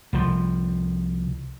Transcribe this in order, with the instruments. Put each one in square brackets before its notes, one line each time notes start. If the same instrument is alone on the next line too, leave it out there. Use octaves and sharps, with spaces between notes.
[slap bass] C2 F3